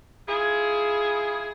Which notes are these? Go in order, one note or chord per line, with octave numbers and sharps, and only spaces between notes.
E4 F4 G#4